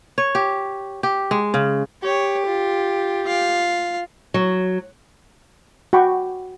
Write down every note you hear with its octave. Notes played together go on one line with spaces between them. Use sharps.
C#5
G4
G4
G#3
C#3
G4 C#5
F4
F4 F5
F#3
F#4 G5 B5 C#6 D6